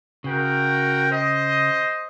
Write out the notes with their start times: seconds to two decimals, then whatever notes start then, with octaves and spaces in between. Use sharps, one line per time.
0.24 C#3 F#4 A#4 G5
1.10 C5 D#5